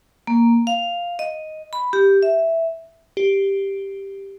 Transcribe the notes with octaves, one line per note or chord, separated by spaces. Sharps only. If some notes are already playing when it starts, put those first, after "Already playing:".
A#3
F5
D#5
B5
G4
E5
G4